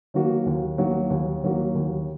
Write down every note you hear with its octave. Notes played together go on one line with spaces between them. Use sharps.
D#3 F#3 A#3 F#4
D#2
D#3 F#3 A#3 F#4
D#2
D#3 F#3 A#3 F#4
D#2